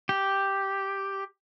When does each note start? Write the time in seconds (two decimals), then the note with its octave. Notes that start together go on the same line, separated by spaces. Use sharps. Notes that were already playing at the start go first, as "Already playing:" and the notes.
0.09 G4